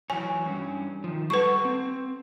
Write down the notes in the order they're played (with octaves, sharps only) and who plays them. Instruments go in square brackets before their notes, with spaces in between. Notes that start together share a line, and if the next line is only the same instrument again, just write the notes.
[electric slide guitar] E3 F#3 C#5 [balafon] G#5
[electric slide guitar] G2 C#4
D#3 F3
[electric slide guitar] G3 A4 F#5 [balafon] B4 C#6
[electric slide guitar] C4